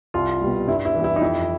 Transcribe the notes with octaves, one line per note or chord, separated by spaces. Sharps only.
C2 F4
B2 G3
G2 E4
E4
E3 G3
E4
D#4
F2 E4